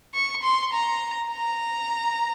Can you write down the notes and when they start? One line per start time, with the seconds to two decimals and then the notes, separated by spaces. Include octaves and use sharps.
0.14 C#6
0.43 C6
0.73 A#5
1.31 A#5